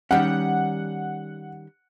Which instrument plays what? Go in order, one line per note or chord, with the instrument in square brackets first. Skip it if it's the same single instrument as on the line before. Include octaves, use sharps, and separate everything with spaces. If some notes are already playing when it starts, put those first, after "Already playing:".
[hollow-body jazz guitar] D#3 G3 C#4 [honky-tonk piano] F#5